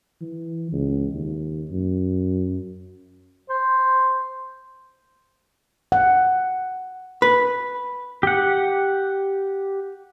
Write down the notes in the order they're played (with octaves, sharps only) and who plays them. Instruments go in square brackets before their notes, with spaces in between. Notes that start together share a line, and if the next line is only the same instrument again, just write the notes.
[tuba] E3
C#2
D#2
F#2
[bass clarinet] C5
[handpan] F#5
[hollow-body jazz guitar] B4
[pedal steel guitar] G4 F#5